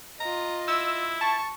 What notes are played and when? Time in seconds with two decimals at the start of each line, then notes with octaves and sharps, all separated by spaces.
0.20 F4 D#5 A#5
0.68 E4 E6
1.21 A5 C#6